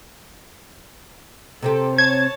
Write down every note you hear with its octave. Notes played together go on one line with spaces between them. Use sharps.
C3 C4 G4 A4
C#5 A5 G#6